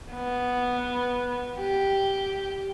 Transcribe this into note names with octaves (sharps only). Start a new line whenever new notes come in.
B3
G4